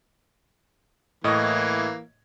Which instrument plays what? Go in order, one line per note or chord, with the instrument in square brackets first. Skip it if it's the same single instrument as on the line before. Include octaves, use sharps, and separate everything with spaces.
[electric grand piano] A2 D#5 C#6 [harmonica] E3 A#3